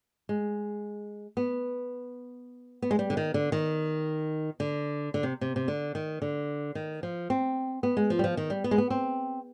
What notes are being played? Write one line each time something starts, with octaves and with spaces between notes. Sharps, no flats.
G#3
B3
B3
G#3
G3
D3
D#3
D3
D#3
D3
D3
C3
C3
C3
D3
D#3
D3
D#3
F3
C4
B3
G#3
F3
G3
F3
D#3
G3
B3
G#3
B3
C4